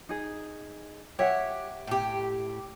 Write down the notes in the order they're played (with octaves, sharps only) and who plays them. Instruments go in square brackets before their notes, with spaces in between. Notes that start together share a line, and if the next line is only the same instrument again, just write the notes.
[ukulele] D#4 G#4
[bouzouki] G4 [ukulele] C#5 E5 F#5
[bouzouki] A2 G4